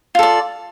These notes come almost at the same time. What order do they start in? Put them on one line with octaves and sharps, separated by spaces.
F4 A4 D5